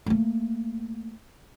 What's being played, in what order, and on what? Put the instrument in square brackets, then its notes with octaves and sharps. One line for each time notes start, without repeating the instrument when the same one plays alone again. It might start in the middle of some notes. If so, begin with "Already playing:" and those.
[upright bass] A3 A#3